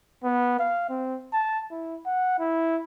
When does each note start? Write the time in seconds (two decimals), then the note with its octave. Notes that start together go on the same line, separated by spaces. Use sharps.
0.24 B3
0.59 F5
0.89 C4
1.33 A5
1.71 E4
2.06 F#5
2.39 E4